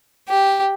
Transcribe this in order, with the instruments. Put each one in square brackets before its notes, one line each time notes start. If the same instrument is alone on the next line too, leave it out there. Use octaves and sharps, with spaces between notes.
[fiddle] G4